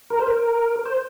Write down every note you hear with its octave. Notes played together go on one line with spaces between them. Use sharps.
A#4
C5
A#4
C5